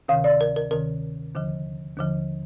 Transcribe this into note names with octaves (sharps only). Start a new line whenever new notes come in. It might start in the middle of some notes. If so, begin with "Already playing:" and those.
D2 C3 D#3 F5
D5
A#4
A#4
D2 C3 D#3 A#4
D#2 D3 F3
D#2 D3 F3